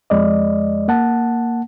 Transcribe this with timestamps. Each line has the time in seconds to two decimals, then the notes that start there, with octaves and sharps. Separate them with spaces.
0.10 F2 G#3 D5 D#5
0.88 A#3 F#5 A5